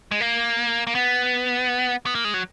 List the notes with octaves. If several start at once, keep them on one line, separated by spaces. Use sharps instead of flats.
G#3
A#3
A#3
B3
B3
A#3
G#3
F#3